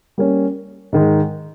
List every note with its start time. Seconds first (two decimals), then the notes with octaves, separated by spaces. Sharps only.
0.18 G3 A#3 C#4
0.92 G#2 D#3 G#3